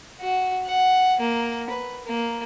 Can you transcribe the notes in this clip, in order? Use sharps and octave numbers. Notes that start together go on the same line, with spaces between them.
F#4
F#5
A#3
B4
A#3